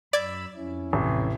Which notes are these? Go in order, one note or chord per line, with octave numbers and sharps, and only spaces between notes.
F#2 D5 B5 E6 G#6
F2 C#4 E4
A1 C3